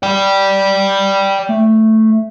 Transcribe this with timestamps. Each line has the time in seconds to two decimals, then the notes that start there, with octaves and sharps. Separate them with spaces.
0.03 D5 G5
1.49 A3